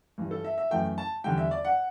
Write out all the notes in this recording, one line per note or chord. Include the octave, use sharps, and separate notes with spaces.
G2 E3 G3
A4
E5
E5
F#2 E3 A3 G5
A5
E2 D3 G3 G5
E5
D5
F#5